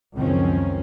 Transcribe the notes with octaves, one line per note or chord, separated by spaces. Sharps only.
C#2 F#2 D#3 F3 C4 C#4